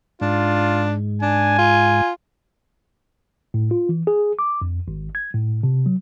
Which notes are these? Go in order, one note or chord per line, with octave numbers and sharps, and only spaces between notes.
G#2 D4 F4
D4 G#5
F4
A2
F4
E3
G#4
D6
F2
G#1
G#6
A2
C3
F#3